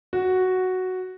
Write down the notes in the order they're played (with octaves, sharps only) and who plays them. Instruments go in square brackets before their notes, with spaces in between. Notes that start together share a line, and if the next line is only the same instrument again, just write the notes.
[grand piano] F#4